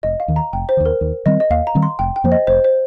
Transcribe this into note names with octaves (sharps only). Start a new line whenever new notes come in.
F1 D#5
F5
D#2 D#3
A#5
F1 G5
C5
D#2 D#3
A#4
D#2
D#3 G3 C4 D#5
D#5
D#2 F5
A#5
D#3 G3 C4
C6
F1 G5
G5
F2 F3 A#3 C5
D#5
F1 C5
C5